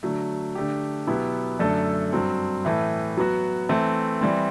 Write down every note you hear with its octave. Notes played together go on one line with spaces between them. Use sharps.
D3 F#3 A3
D3 A3 D4 G4
B2 F#3 B3 E4 G4
F#2 D3 A3 D4 A4
G2 F#3 C4
A2 E3 A3
F#3 B3 F#4
E3 A3 C4
E3 G3 C4